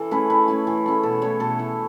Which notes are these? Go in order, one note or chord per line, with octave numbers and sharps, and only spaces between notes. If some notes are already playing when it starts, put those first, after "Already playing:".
Already playing: E3 A4
A3 C#4 E4 B4
E3 B4
A3 C#4 E4
E3
A3 C#4 E4
B2 A4
A3 E4 C#5
B2 A4
A3 E4